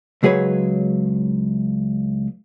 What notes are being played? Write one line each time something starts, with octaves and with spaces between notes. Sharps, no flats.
C#2 F#3 G#4 B4 C#5